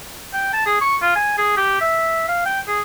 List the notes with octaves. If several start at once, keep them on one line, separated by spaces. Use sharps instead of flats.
G5
A5
G#4
C#6
F4
G#5
G#4
G4
E5
F5
G5
G#4